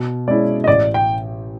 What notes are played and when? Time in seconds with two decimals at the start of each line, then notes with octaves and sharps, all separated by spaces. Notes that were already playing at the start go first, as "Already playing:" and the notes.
Already playing: B2
0.28 G#3 C#4 E4 G#4 D5
0.64 D#5
0.68 A1 D5
0.94 G5